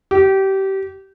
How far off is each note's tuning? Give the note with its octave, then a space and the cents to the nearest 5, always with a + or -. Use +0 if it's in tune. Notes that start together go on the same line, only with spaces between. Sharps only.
G4 -25